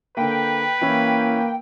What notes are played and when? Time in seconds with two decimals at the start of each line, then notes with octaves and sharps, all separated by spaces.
0.17 D3 A#3 B4 G5
0.81 E3 A#3 C#4 E4